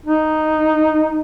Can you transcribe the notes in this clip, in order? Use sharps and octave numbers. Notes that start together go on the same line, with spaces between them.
D#4